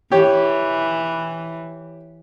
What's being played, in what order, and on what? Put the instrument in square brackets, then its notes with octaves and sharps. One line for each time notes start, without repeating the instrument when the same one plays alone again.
[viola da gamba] E3 [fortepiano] G4 C#5